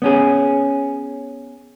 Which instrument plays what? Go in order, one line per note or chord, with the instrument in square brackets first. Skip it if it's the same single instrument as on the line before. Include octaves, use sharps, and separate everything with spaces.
[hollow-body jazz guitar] B3 C#4 G#4